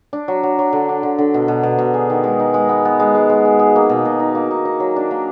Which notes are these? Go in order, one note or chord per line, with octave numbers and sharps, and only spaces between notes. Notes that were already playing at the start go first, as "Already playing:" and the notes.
D4
F#3
F#3
F#3
D3
D4
D3
D3
B2
B2
B2
B2
G#4
D#3
G#3
D#4
G#3
B3
B3
G#3
G#3
G#3
G#3
G#4
A#3
B2
B2
D#4
A#3
D#4
D#4
F#3
D4
A#3